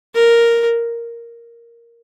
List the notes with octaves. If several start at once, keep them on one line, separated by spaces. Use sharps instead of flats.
A#4